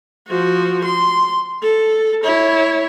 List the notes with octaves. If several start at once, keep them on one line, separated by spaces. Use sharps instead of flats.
F3 F#4
C6
A4
E4 C#5